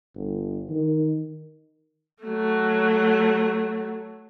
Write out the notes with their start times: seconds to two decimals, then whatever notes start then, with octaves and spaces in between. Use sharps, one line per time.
0.15 G1
0.69 D#3
2.24 F#3 A3